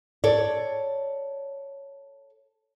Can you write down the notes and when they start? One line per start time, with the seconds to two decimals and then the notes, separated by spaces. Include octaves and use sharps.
0.24 A4 C#5 D5